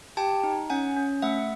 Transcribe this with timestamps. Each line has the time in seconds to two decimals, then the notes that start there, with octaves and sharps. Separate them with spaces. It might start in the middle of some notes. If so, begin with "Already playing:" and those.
0.17 G4 G5 A5
0.44 D#4
0.70 C#4 F#5 G#5
0.96 C#4
1.22 A3 E5 F#5